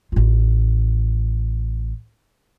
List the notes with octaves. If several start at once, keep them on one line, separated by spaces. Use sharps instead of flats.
A1 F4